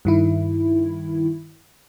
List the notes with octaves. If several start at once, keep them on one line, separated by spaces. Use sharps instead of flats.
G2 D#3 E4